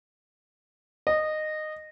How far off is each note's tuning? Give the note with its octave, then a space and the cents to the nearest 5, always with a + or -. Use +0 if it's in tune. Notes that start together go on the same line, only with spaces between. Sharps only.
D#5 -15